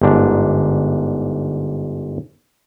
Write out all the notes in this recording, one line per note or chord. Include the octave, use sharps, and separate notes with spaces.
G1 G#2 D4